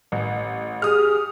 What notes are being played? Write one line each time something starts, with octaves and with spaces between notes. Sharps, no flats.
A1
G4 G#4 D#6 F6